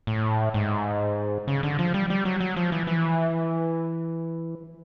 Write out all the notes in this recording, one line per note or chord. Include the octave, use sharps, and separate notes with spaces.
A2
G#2
C#3
D3
F3
G3
G3
F#3
F#3
F3
E3
E3